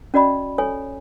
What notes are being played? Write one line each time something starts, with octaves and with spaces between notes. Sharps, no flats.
C#4 F#4 D5 D#5 B5
A4 C#5 G#5